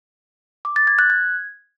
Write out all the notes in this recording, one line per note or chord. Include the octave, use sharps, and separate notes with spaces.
D6
A6
G#6
F#6
G#6